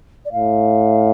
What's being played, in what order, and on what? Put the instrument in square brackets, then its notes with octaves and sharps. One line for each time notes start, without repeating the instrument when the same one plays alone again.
[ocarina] D5
[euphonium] A2 [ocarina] F5